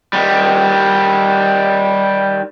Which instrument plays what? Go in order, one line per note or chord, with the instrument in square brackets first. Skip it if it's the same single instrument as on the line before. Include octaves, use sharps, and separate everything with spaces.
[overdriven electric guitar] D#3 G3